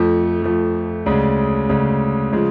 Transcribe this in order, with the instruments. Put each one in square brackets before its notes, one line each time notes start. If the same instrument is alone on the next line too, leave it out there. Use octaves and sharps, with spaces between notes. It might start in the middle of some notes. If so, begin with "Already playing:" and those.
Already playing: [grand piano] F2 F3 A3
F2 F3 A3
D2 C#3 G#3
D2 C#3 G#3
C#3 F3 G#3